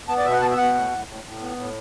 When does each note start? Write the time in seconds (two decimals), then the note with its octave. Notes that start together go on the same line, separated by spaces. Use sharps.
0.08 B3 A5
0.18 D5
0.25 B2 E5
0.33 F#5
0.42 B3 A5
0.51 E5
0.57 B2 F#5
0.75 A2
0.91 A2
1.08 A2
1.24 A2
1.40 B3
1.57 A2